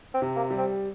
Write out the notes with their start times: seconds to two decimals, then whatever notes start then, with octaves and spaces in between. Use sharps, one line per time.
0.14 C4
0.22 C3
0.36 A#3
0.51 G3
0.58 C4